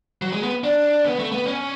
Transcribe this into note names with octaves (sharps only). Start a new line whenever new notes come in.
F#3
G#3
B3
D4
B3
A3
B3
C#4